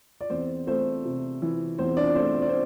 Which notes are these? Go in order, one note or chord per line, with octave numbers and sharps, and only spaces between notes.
D5
E2 C4 C5
A3 C4 C5
C3
E3
E2 C4 C5
D4 D5
A3 C4 C5
C5
D5
C4 C5